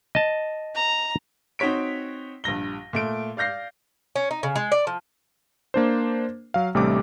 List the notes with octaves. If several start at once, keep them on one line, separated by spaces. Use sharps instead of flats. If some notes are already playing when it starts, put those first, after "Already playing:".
D#5 A5
A#5
C4 D#4 F#4 C#5 B6 D7
A#1 G2 A#6 G7
A#2 A3 D7
D5 F5 G6 A#6 C7
C#4
D#4
C#3
G#3
D5
F3
A#3 D4 C5
F#3 F5
A1 C3 G3 A3 D4 D6